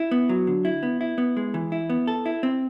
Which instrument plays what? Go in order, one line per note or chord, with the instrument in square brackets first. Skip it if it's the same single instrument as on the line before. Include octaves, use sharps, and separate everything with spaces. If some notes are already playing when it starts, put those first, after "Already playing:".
Already playing: [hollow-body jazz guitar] E4
B3
F#3
D3
E4
B3
E4
B3
G#3
E3
E4
B3
A4
E4
C4